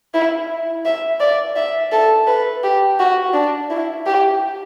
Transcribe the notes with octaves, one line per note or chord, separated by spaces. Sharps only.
E4
E5
D5
E5
A4
B4
G4
F#4
D4
E4
G4